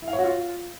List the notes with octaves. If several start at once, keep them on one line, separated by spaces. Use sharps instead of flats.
E4
F5
C#5
F#4
F4